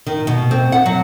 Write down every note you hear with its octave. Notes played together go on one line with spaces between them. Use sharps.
D#3
B2
C4
F#5
F#3